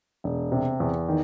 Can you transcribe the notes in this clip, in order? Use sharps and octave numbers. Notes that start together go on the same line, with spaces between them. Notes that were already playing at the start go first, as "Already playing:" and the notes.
E1
C3
E2
D#3